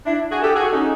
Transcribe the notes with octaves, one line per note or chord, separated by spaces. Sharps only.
D4 E4
F#4 G#4
G4 A4
F#4 G#4
C#4 D#4